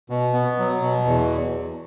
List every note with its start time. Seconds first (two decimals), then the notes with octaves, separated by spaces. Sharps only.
0.10 B2
0.33 B3
0.58 F#3
0.82 B2
1.06 E2